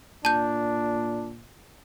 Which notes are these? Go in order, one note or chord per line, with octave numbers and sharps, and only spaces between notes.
A#2 D4 A5 G6